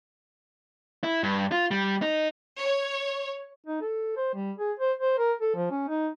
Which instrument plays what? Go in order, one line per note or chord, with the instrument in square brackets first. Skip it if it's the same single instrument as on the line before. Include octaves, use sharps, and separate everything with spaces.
[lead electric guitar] E4
G2
F4
G3
D#4
[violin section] C#5
[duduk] D#4
A4
C5
G3
G#4
C5
C5
A#4
A4
F3
C#4
D#4